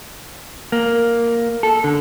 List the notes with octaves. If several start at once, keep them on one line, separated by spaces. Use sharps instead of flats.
A#3
A4
D3